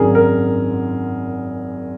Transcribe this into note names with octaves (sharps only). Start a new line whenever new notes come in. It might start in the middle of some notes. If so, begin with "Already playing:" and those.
Already playing: G#1 F#2 D#3 F#3 G#4 A#4
A#4